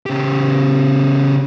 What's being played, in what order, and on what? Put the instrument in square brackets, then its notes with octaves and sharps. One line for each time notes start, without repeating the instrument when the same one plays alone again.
[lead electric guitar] C#3 G4